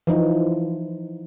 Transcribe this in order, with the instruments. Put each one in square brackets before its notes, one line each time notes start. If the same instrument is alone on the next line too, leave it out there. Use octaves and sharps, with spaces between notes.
[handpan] E3 F3 D#4